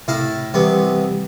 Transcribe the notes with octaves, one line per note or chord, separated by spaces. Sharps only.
A2 C3 E4 F5
C2 C3 E3 G3 B3 G4